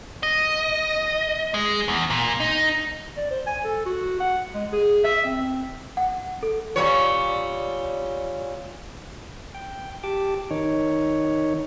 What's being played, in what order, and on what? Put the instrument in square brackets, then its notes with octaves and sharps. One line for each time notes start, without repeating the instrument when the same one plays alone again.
[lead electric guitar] D#5
G#3
E2
A#2
D#4
[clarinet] D5
C5
G#5
A4
F#4
F#5
G#3
G#4
E5
C4
[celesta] F#5
A4
[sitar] A#2 G3 C#5
[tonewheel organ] G5
G4 A5 D6
D#3 D#4 C#5